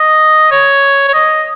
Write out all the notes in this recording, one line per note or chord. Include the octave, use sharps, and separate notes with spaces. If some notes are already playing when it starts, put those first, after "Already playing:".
Already playing: D#5
C#5
C#5
D#5